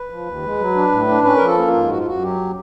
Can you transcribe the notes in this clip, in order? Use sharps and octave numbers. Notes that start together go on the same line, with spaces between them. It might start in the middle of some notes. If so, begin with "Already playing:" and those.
Already playing: B4
F3
D#2
G#3
F#3
D4
A2
D4
C#4 B4
A#4
F3 A4
A#3
F4
G#2
F#2 F#4
F4
F#2 F#4
F#3 G4